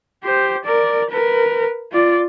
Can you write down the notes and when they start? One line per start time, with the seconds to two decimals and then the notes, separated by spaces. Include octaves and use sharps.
0.24 G4 C5
0.65 A#4 D5
1.11 A#4 B4
1.92 F4 D5